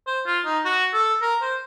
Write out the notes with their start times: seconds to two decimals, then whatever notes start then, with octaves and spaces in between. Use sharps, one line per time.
0.07 C5
0.26 F4
0.45 D#4
0.65 F#4
0.93 A4
1.22 A#4
1.42 C5